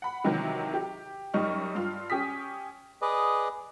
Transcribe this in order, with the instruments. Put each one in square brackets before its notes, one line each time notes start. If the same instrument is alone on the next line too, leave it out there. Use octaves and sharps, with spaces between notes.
[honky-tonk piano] F#5 B5
C3 D#3 E3 F#3
G4
F#2 G3 D#4 C#6 F6
G2 F4 F6
C#4 G4 G#5 D#6 B6
[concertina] G#4 B4 D5 D#5